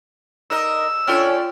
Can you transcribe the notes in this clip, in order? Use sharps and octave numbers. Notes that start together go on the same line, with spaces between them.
D#4 A#4 D#5 E6
C#4 D4 F4 A4 C#5 G5 F6